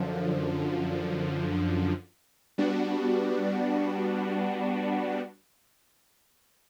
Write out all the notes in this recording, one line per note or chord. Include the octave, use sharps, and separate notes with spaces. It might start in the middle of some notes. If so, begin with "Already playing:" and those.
Already playing: F#2 D3 F3
G3 B3 D4 F#4